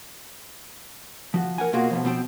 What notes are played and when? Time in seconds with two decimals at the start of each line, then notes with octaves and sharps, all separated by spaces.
1.34 F3 F#4
1.58 A#4 F#5 G#5
1.73 B2 A#3 F4 F#4 G#4
1.91 B2 D#3 F3
2.04 B2 F3 C4 C5 G5